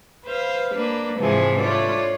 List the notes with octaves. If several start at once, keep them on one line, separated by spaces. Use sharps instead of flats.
B4 C5 F5
A#3 D4 B4
G#2 C3 E3 F3 G#3 G#4
A3 D4 F4 C#5 D5